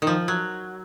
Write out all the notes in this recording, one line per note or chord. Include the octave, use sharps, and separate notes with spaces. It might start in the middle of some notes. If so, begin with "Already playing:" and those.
D#3
F3
F#3